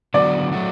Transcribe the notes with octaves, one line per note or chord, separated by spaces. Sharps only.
D3 F#3 B3 F#4 D5
F#3 A3 F#4